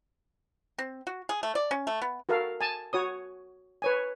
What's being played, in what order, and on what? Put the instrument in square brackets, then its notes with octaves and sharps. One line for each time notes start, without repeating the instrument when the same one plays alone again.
[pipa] C4
F#4
G#4
A3
D5
C#4
A3
B3
[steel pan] F#4 A4 A#4 F5
G#5 A5
F#4 C#5 D#6
B4 C#5 G#5